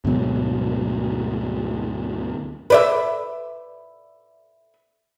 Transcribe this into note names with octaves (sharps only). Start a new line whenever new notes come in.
D2 G#2 B2 F#3
B4 D5 E5